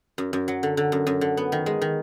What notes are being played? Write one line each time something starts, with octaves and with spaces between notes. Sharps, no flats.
F#2
F#2
F#3
D3
D3
F#2
F#2
D3
B3
D#3
G#3
D#3